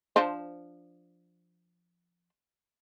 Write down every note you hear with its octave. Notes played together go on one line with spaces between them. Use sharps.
F3 D4 C5